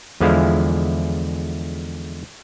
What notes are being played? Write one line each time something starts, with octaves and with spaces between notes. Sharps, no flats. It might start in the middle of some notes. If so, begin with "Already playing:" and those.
E2 D3 F3 G#3 E4 F5